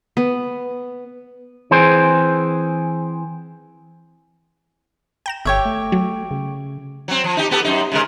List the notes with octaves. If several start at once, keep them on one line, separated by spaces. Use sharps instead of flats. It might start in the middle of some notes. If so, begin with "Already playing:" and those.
B3
E3 C4 G#4 C5
G5 A#5 E7
G1 G4 C#5 E5
A3
F#3
C#3
F#3 C4
F3
D#4 G4
B3 G4 A4
F#2 D#4
C#3 G#3 A#4